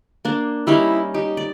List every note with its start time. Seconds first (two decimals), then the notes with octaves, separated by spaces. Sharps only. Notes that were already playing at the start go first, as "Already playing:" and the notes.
0.25 A#3 D4
0.67 G3 C#4 D#4 E4
1.14 D#4 G4
1.37 D5